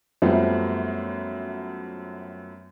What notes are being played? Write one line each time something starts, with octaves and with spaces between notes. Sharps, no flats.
F#2 F3 G3 A3 B3 C4